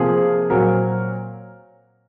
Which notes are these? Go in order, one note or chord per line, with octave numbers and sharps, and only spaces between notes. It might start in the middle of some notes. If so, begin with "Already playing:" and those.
Already playing: C3 F3 A#3 F4 G#4
A#2 F#3 C4 F#4 A#4